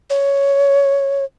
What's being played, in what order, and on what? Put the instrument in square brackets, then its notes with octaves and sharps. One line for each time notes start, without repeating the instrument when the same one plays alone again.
[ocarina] C#5